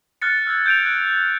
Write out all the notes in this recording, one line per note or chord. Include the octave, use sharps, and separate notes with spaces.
F6 F#6 A6 C#7
E6 G#6
G6 D7 F7
F#6